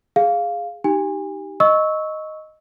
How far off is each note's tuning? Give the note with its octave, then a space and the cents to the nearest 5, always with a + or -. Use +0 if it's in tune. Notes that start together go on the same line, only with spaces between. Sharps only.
G#4 +0 F5 +0
D#4 +0 G4 -10 G#5 -30
D#5 +0 C#6 +0 E6 -20